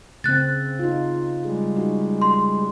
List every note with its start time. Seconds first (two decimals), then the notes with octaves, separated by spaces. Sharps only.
0.24 C#3 C4 F#6 A6
0.79 D#4 F4
1.45 G3 G#3
1.76 C#4 D#4 F#4
2.22 C6